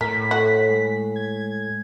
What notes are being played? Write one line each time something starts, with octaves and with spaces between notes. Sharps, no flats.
A2 A#4 B6
F#4 A4
G#3
G#6